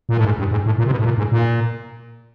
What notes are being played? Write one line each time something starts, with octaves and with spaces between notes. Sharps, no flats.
A#2
A2
G#2
G2
G#2
A2
A#2
C3
B2
A2
A#2
G#2
A#2